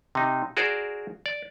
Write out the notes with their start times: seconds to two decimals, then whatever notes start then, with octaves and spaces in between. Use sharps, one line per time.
0.15 C3 D#4
0.57 F#4 G#4 A#4 C5 D5
1.26 D5